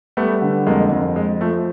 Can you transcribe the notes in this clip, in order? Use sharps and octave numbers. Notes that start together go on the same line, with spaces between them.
G3 A3 B3
D3
F2 G#3 A#3
F2
G#3
F3 A3